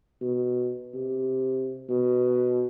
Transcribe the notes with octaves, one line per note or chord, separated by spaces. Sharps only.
B2
C3
B2